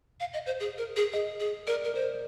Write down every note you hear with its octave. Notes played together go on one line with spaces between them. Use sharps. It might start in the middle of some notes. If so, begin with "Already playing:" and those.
F5
D#5
C5
G#4
A#4
G#4
G#4 D#5
G#4
A#4 D5
A#4
A#4 C5